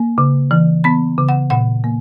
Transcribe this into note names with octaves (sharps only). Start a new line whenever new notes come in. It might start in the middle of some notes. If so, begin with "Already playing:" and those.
Already playing: A#3
C#3
E3
B3 B5
C#3
F#5
A#2 F#5
A#3